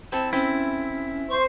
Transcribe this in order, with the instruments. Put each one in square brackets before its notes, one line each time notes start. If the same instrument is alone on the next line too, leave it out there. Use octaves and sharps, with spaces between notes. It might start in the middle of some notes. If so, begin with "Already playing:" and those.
[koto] C4 E4 A4 [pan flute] A5
[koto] C4 [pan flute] C#4 [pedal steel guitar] E4
[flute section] C5 [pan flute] C#6